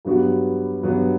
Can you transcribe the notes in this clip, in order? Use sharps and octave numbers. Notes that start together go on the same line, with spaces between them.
G2 F#3 B3 F#4
G2 F#3 B3 F#4